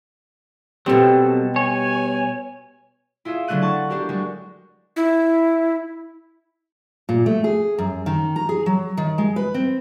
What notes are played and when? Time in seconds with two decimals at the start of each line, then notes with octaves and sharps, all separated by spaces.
0.86 B2 F#3 G3 C4 A4
1.56 C#5 G#5
3.25 E4 F4 G#4 E5
3.47 D3 F#3 A3 D4 F#6 D#7
3.62 F#5 A5 C#6
3.90 D4 F#4 G4 A#4
4.09 G3 G#3 F#4
4.96 E4
7.09 A#2
7.26 A3
7.44 G#4
7.78 F#2
8.06 D#3
8.36 A#5
8.49 G#4
8.66 F#3
8.97 D#3
9.18 G#3
9.36 B4
9.54 C4